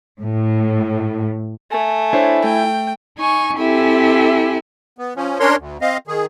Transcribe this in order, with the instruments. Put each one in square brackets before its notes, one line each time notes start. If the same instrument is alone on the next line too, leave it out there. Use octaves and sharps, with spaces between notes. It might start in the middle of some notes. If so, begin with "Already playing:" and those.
[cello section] A2
[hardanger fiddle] A3 [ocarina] G#5
[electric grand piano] D4 C5 C#5 [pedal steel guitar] E4
[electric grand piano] A3 [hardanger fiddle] G5
[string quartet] D#4 G#5 C#6
C4 E4 G4 A4 E5 G#5
[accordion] B3
F3 C#4
C#4 D4 A#4 C#5 C6
D2
C4 D#5 F5
D#3 G#4